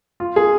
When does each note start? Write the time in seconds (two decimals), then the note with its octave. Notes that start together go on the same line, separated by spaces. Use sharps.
0.20 F4
0.36 G#4